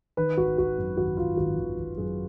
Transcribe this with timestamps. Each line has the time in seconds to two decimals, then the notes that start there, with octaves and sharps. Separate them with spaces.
0.17 D#3 B4
0.37 G#1 F#4
0.58 G#1 F#4
0.78 F#2
0.97 G#1 F#4
1.17 G#1 F4
1.37 G#1 F#4
1.57 G#1
1.78 G#1
1.97 F#2 G#4